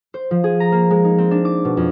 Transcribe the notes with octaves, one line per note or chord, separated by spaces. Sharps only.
C5
F3
G#4
A#5
A#3
G#3
D#4
C4
D4
D6
B2
F2